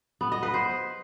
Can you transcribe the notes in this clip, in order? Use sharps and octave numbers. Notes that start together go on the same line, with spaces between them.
B3
D#5
B4
C5